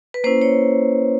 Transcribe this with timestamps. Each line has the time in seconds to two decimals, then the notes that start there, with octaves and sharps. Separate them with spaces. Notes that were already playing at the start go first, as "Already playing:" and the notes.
0.14 B4
0.24 A#3 C#4 E4 C5
0.42 C#5